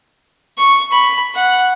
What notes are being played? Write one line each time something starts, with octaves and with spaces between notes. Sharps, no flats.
C#6
B5
F#5